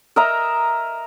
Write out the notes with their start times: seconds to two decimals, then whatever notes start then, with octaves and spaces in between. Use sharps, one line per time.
0.16 A#4 D#5 E5 A#5